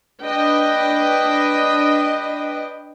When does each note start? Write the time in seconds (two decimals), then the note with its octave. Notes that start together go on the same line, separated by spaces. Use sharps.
0.22 D4 B4 D#5 G5